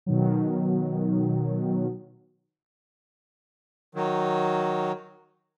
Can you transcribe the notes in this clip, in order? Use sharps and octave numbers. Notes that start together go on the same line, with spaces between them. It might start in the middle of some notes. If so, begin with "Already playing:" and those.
B2 D#3 F#3
D#3 F#3